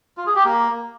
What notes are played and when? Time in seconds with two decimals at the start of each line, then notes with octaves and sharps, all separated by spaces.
0.17 F4
0.26 G#4
0.35 G4
0.44 A#3